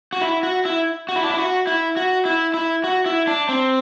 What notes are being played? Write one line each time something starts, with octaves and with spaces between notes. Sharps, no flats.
F#4
E4
F#4
E4
F#4
E4
D4
E4
F#4
E4
F#4
E4
E4
F#4
E4
D4
C4